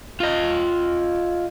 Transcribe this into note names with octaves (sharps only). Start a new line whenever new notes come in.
F4 D#5